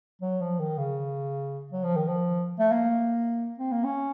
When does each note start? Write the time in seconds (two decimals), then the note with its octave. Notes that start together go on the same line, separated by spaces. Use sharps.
0.22 F#3
0.41 F3
0.60 D#3
0.78 C#3
1.72 F#3
1.84 F3
1.96 D#3
2.08 F3
2.59 A3
2.71 A#3
3.58 C4
3.72 A#3
3.84 C#4